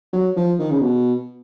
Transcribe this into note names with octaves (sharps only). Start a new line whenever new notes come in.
F#3
F3
D#3
C#3
B2